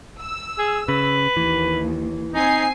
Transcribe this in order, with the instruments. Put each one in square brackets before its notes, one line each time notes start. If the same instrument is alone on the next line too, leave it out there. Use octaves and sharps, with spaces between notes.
[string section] E6
[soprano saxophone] G#4
[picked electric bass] C#3 [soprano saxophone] B4
[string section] D#2 [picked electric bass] E3
[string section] C4 G#5 C7 [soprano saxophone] D#4